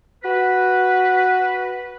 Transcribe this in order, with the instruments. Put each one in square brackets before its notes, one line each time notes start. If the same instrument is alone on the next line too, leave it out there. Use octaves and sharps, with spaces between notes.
[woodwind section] F#4 B4